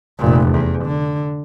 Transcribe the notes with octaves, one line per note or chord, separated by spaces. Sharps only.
F1 A#2
E2
D3